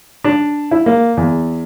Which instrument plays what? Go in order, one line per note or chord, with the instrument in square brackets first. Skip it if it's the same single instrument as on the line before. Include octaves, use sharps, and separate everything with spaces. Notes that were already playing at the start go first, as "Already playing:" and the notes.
[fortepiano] D4
E4
A#3
E2